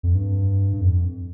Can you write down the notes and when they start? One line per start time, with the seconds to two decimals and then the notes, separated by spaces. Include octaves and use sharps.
0.03 F2
0.15 G2
0.73 G2
0.81 F2